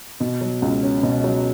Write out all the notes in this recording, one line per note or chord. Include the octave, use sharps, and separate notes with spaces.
B2
F#3
C#2
C#4
B2
F#3